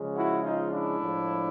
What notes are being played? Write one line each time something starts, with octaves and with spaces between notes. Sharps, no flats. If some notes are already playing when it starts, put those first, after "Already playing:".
Already playing: C#3 F3 G#3
E4 F#4
D#4 F4
D4 E4
A2 F3 G#3